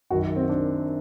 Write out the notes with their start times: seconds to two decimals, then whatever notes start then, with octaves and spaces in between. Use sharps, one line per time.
0.10 F#2 D#3 F#4
0.36 C4
0.49 D4